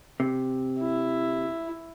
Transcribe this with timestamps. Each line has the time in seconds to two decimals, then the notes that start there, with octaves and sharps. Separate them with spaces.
0.20 C3
0.80 E4